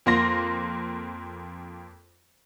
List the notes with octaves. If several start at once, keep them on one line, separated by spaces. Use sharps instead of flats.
F2 A#3 C6 A#6